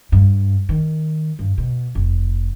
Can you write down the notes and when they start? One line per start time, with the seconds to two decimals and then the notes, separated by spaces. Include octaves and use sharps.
0.12 G2
0.69 D#3
1.39 G2
1.58 B2
1.95 F1